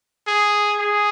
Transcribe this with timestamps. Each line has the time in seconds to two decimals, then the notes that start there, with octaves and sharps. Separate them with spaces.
0.27 G#4
0.80 G#4